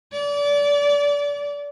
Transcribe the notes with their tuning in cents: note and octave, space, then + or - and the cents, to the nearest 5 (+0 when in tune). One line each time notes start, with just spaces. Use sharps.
D5 -30